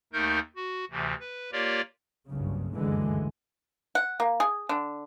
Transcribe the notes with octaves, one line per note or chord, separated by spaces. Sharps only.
D#2 A3 D#4 A#4 G6
F#4
D2 C3 E3
B4
A#3 F4 G4 A#4 C#5 D5
F#1 C2 G2 C#3
F#1 D2 G2 D3 E3 G#3
F#5
A#3
G#4
D3